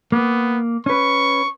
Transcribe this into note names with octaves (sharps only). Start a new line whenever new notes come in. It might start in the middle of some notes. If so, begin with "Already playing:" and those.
A#3 B3
C#4 B4 C#6